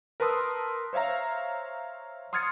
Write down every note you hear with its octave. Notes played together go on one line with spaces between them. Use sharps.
A#4 B4 A5 C6 D#6 E6
C5 C#5 E5 F5 A#5
C6 D#6 F6 G#6 A6 C#7